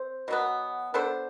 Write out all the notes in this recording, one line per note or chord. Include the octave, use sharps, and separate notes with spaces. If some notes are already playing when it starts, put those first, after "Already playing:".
Already playing: C4 C5
B2 F#3 B3
B3 D4 A4 C5